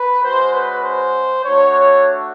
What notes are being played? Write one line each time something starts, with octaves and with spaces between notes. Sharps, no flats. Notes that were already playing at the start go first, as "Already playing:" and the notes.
Already playing: B4
G#3 C#4 F#4 C5
B4
C5
A3 D4 F#4 C#5